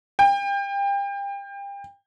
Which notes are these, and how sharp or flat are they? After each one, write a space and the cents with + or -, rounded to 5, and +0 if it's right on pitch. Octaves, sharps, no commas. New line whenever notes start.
G5 +30